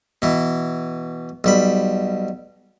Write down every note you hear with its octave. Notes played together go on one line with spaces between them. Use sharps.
B2 E3
B1 G3 B5